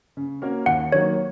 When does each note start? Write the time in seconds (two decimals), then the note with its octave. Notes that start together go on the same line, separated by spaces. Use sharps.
0.17 C#3
0.42 A#3 C#4 F#4 A#4
0.66 D#2 F#5
0.92 D#3 F#3 A#3 C#5